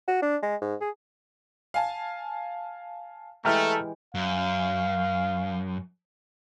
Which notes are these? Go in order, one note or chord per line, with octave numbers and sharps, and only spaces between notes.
F#4
D4
G#3
G#2
G#4
F5 G#5 A5
E3 G#3 A3 G4 A#5 F6 G6
F#2 F5